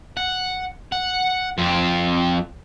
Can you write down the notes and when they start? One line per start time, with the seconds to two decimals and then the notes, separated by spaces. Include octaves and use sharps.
0.17 F#5
0.92 F#5
1.58 F2 C4